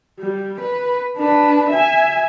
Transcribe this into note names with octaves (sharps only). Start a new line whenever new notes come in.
G3
B4
D4 B4
E5 G#5